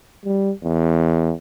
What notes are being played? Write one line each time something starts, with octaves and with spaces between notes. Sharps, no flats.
G3
E2